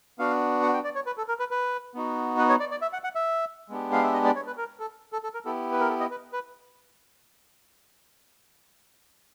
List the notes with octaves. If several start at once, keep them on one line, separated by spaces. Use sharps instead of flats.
B3 D4 F#4 F5
F#5
G5
D5
C#5
B4
A4
A#4
B4
B4
B3 D#4 F#4
B4
C#5
D5
D5
E5
F#5
F#5
E5
G#3 B3 D4 G4
F5
E5
D#5
D5
C#5
B4
A#4
A4
A4
A4
A#4
B3 E4 G4 A4
B4
A#4
A4
D#5
B4
B4